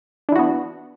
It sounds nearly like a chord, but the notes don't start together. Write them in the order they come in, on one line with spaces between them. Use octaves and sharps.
D4 E3 F#4 B3